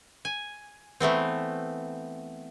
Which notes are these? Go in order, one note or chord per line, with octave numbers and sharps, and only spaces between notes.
G#5
E3 A3 B3 C4